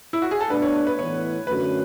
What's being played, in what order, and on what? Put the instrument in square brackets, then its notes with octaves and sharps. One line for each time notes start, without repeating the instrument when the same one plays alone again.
[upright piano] E4
F#4
G#4
A4
[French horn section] B2 A3 D4 [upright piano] B4
[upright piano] C#5
B4
[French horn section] A2 E3 B3 [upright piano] C#5
[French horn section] F#2 D3 A3 C#4 F#4 [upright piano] B4